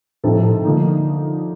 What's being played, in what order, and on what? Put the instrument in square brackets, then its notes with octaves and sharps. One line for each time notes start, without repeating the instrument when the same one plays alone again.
[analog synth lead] A2 [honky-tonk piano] C3 F3 C4 D#4 A4
[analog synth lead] A2
C3
[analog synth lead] D3 [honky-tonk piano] F3 A#3 D#4